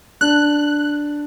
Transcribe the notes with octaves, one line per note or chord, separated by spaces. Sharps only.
D4 F#6